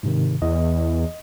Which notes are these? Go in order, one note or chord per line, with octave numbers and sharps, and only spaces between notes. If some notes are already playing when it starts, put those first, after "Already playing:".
G#2 C3 D#3
E2 D#5